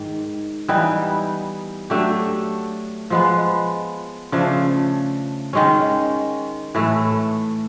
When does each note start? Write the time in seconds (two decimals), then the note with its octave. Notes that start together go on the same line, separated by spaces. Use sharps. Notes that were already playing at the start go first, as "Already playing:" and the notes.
Already playing: G#2 D#3
0.69 E3 G3 B3 D#4
1.90 F#3 A3 D4 G4
3.10 F3 G#3 B3
4.32 C#3 F3 A3 D4
5.53 D#3 G#3 C#4
6.75 A2 E3 A3